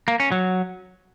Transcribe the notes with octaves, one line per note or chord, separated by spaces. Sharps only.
A#3
C#4
F#3